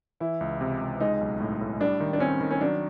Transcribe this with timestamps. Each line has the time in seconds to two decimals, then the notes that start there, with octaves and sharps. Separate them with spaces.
0.20 E3 E4
0.41 C#2
0.61 C3
0.81 C#2
1.00 G#3 D#4
1.21 B1
1.40 A2
1.61 A2
1.80 G3 D4
2.00 D#3
2.13 D4
2.20 C4 C#4
2.41 D#3
2.51 C#4
2.61 F#3 D4